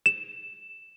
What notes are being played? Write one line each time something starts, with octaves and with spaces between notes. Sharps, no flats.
E7